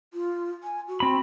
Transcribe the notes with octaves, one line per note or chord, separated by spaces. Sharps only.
F4
G#5
F#4
C4 B5